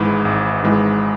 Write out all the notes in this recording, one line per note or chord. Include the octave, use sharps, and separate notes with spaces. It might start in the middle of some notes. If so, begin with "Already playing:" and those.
Already playing: G#1 G#2 E3 G#3 B5
G#1
G#2 E3 G#3